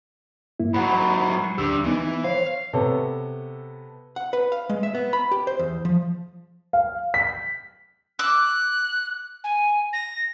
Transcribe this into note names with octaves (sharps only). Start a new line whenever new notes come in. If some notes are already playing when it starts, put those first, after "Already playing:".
G2 A#3 E4
G#2 F#3 F#5 B5
D2 D4 G4 E6
E3 B3 D#4
C5 C#5 F5
C3 B3 A4 C#5
F#5
B4
F5
G#3
E5
B3
B5
G4
C5
E2
F3
F5
B6
D6 E6 F#6
G#5
A#6